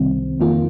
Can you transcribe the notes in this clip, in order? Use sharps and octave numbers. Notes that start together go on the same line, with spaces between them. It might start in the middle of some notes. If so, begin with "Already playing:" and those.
Already playing: C2 C3 D#3 G3 C4
F2 D#3 A#3 F4